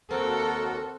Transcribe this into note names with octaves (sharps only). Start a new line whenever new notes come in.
D#2 C4 F#4 A4 A#4